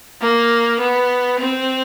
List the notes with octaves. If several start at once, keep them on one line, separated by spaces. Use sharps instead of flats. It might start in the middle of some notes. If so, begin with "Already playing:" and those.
A#3
B3
C4